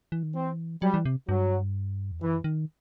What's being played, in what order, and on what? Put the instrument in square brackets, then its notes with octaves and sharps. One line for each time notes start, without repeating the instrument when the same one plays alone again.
[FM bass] E3
D#3
[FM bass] E3 [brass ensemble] C4
[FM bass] F#3 [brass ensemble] G3
[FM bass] E3
C3
[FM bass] G2 [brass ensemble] F#3
[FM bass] E2
[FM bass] F#2 [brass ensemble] E3
[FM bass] D#3